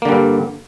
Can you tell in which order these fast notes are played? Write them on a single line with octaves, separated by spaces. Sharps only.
A#3 D3 G3 G2